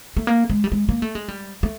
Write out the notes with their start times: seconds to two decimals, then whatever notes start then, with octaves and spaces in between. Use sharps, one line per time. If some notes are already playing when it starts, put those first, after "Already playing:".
0.17 A3
0.27 A#3
0.50 G#3
0.64 G3
0.72 G#3
0.89 A#3
1.02 A3
1.15 G#3
1.28 G3
1.63 A3